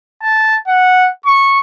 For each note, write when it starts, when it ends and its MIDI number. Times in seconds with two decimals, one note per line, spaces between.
0.22 0.57 81
0.68 1.10 78
1.26 1.59 85